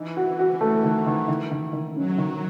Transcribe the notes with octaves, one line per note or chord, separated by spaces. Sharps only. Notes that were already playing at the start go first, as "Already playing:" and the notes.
Already playing: E3 D#4
F#4
F#4
A3
D#3
D#3
D#3
D#3
D#3
F#3 C#4
D#3